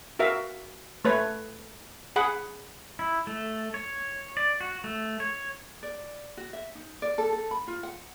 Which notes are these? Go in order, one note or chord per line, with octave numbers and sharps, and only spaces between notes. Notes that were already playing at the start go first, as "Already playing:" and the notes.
F#4 A#4 E5 F5
A3 B4 C#5
G#4 F#5 B5
E4
A3
C#5
D5
F#4
A3
C#5
D5
F#4
E5
D#4
D5
A4
A4
B5
F4
F#5